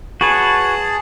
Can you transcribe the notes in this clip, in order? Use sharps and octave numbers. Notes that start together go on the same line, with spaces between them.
F#4 G#4 B4 C#5 A5